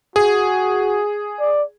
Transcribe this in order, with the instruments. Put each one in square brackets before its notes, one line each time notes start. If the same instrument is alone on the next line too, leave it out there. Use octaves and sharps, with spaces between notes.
[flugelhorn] F#4 [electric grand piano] G#4
[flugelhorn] D5